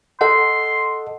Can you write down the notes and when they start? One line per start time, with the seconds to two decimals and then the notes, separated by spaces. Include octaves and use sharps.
0.21 A4 D#5 F#5 C6